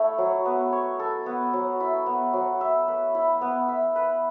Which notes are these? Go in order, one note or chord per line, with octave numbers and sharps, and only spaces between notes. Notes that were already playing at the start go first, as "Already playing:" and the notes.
Already playing: A3 E4 C#5
F#3
B3
C#5
A4
B3
F#3
E4
B3
F#3
E5
B4
E4
B3
E5
B4